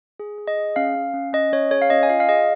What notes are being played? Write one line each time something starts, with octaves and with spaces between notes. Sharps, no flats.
G#4
G#4
D#5
G#4
C#4 F5
C#4
C#4
C#4 D#5
C#4 C#5
G#4 C#5
F5
C#4 D#5
G#5
F4 F5
F5
G#4 D#5